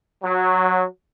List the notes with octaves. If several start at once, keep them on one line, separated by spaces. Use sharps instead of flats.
F#3